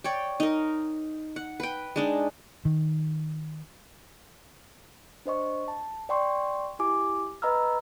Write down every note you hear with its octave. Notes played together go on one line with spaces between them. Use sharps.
C#5 D5 G5
D#4 A#4
F#5
B4 G5
G#3 D4 D#4
D#3
D4 C5 D#5 C#6
A5
D5 G5 C6 C#6
E4 G4 G#5 D6
B4 D#5 A#5 B5 E6 F6